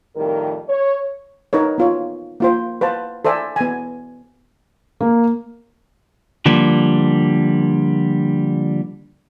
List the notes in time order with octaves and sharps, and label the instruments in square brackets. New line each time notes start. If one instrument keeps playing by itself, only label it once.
[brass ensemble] F2 A2 D#3 G3 A#4
C#5
[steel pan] D#4 A#4 B4 C#5
B3 F4 C#5
A#3 F4 C5
B4 C5 F5 A5
A4 C5 D5 E5 G#5
B3 G#5
[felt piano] A#3
[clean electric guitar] D3 F3 G3 A#3